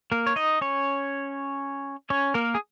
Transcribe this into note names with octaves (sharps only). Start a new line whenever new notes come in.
A#3 A#4
C#5
D#4 D#5
C#4 C#5
C#4 C#5
A#3 A#4
G#4